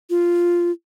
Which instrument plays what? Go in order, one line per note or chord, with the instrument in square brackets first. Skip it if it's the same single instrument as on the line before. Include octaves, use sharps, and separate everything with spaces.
[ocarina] F4